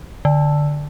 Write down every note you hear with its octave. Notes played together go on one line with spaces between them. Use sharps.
D3